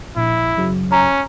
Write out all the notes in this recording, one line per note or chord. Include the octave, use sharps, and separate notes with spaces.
A#1 E4
F#2 C#3 F#3
C#4 A#5